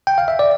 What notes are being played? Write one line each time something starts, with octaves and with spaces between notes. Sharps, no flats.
G5
F5
E5
D5